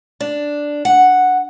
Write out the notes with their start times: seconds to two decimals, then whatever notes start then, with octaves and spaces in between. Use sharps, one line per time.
0.20 D4
0.85 F#5